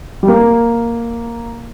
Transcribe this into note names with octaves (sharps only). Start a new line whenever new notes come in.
G3
A#3